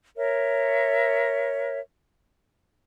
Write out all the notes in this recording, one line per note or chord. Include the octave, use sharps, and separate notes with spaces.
A#4 C#5 E5